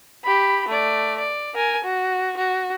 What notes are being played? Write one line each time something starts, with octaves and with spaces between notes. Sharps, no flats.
G4 B5
A3 D5
D5
A#4 G#5
F#4
F#4